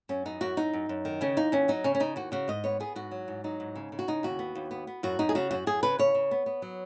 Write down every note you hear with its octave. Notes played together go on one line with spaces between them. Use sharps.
F#2 C#4
B3 D#4
F#2 F#4
F#2 D#4
F#2
F#2
D#3
C#3 C#4
D#2 D#4
D#2 C#4
F#3 D#4
C#3 C#4
C#4
C#3 D#4
D#2 F#4
C#3 F#4
G#2 D#5
B3 C#5
B3 G#4
G#2 F#4
F#3
G#2
F#3 D#4
G#2
C#3
C#3
F#4
C#3 D#4
D#2 F#4
B3
D#2
B3
B3
F#2 F#4
F#2 D#4
G#4
C#3 F#4
F#2 F#4
F#2 G#4
C#3 B4
C#3 C#5
C#3
B3
B3
F#3